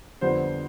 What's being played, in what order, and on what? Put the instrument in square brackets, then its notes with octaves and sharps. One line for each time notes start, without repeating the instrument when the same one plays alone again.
[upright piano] F2 D3 G3 B3 C5